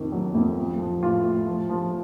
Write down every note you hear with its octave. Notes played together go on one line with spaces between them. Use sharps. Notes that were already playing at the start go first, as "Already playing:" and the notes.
Already playing: F2 D#3
F#3
F2
F3
F3
A2 F4
A2
F3
F3